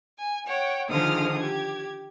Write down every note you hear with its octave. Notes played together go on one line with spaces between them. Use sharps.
G#5
C#5 F#5 G5
D3 D#3 F3 G#3 D#6 F6
G4 G#6